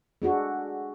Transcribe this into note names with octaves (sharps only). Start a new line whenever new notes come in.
G#3 D4 F#4 A4